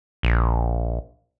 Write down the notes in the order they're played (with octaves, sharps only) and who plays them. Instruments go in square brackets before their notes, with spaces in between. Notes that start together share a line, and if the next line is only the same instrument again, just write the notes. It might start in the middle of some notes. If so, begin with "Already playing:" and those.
[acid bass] A#1